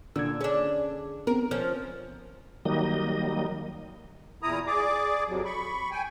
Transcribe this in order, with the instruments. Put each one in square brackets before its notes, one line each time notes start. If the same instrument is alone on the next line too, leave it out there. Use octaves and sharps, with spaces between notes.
[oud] A#2 [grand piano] D3 [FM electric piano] E6 G#6
[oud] C#4 D4 [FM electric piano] G#4
[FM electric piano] B3 C4 [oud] A#4
[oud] F3 C#4 [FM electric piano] F6
[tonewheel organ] D#3 F#3 G3 A#3 D#5
[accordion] E2 A#2 E4 A#5 D#6
G#4 D5 D6
F2 C3 F#3
B5 C#6
G5 G#5